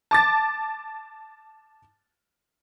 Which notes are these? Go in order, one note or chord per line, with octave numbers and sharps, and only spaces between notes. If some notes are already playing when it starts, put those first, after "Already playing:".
A5 D6 A6